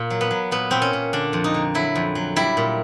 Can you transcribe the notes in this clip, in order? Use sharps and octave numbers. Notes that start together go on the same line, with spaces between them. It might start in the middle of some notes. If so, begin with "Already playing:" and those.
Already playing: A#2
F#3
B3
F#3
A#2 B3
A#2 C4
C#4
A#2
D3 D4
F2
D#4
D3
F#3 E4
F2
F#3
G3 E4
A#2